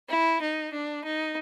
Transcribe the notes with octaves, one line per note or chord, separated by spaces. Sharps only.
E4
D#4
D4
D#4